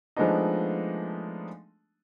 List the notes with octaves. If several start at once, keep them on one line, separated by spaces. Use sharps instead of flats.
F3 G#3 A3 B3 D4 D#4